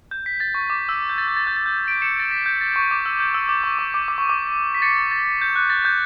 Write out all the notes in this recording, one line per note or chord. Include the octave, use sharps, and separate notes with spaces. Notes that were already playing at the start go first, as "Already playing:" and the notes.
G6
B6
A6
C#6
D6
E6
G6
A6
G6
A6
G6
A6
G6
B6 D7
C#7 E7
A6
B6
G6
A6
C#6
D6
E6
G6
E6
D6
C#6
D6
D6
D6
C#6
D6
B6
A6 C#7
A6
G6
F#6
A6
G6